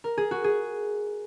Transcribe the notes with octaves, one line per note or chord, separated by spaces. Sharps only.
A#4
G#4
F#4
G#4